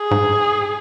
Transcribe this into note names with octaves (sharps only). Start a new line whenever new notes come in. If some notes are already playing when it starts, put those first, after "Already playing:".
Already playing: G#4
G#2